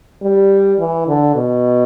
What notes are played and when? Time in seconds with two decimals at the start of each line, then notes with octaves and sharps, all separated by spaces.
0.23 G3
0.79 E3
1.08 D3
1.36 B2